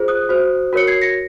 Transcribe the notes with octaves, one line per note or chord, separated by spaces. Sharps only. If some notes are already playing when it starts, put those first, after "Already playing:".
Already playing: F4 G#4 C5
D#6 F#6
F#4 C5
F#4 A#4 C#5 C#7
G#6 C7
A#6 C#7